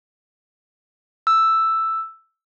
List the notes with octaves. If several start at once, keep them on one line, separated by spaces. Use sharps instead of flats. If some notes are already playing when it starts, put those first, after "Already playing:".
E6